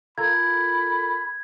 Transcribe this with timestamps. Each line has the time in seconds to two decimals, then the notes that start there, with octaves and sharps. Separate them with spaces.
0.18 F4 A4 A#4 B5 G#6